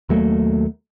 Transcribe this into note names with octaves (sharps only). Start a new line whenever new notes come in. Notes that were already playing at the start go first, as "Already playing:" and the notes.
D#2 F#3 A3 A#3